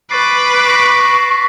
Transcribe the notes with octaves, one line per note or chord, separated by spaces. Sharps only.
B4 C#6 D6 A6 C7
C#6 A#6 B6 E7